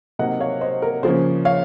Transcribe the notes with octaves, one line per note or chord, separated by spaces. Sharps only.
C3 F#3 A#3 D#4 D#5 F#5
C#5 F5
C5 D#5
A#4
C#3 F3 A#3 C#4 G#4 C5
C#5 F5